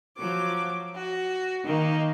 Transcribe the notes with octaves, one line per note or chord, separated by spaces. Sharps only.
F3 F#3 D6
F#4
D#3 A#3 D#4